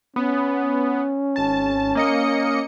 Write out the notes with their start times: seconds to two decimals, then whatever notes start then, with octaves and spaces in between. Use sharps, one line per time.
0.16 B3 C#4
1.36 G#1 A5
1.95 A#3 D#5 C#7